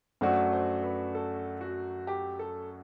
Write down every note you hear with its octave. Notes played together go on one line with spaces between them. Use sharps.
F#2 F#3 A3 D4 F#4 C5
C5
B4
A4
F#4
G4
A4